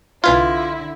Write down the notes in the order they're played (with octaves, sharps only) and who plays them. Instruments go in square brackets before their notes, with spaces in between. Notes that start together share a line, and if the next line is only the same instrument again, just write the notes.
[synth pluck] C2 B4 G#6 [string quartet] D3 E4 [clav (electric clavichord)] F4